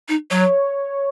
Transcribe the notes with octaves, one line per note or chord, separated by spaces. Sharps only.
D#4
F#3 C#5